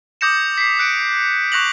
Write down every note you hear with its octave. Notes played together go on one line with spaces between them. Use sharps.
D6 D#6 G6 A#6 C#7 E7
B6 C7
F#6 C#7 D7
C#6 F#6 A#6 F7 F#7